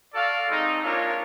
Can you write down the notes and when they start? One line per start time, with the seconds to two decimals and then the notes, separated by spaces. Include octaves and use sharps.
0.13 F#4 A4 D5 F5
0.47 G#3 C4 D#4
0.81 A#3 D4 F4 A#4 C#5